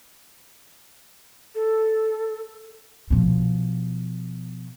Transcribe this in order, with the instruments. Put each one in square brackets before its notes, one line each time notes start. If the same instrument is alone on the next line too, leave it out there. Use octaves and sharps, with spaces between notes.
[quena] A4
[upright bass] B2 F3